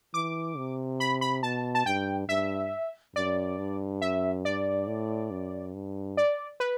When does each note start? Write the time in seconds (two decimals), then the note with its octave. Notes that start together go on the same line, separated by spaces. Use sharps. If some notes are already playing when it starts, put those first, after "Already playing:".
0.14 E3 D6
0.57 C3
1.00 B5
1.21 B5
1.43 B2 A5
1.75 A5
1.86 G2 G5
2.28 G2 E5
3.15 F#2 D5
3.58 G2
4.01 F#2 E5
4.45 G2 D5
4.87 A2
5.31 F#2
5.74 G2
6.17 D5
6.60 B4